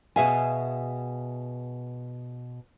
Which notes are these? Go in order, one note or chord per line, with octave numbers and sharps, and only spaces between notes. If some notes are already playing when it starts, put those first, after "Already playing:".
B2 G#4 E5 F5 G#5